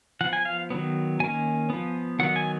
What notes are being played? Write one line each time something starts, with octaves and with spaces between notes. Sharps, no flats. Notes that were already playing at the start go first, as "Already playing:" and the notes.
F3 B3 F#5
G#5
F5
D#3 F#3 B3
D#3 A#3 C#4 G#5
F3 B3
D#3 F#3 B3 F#5
G#5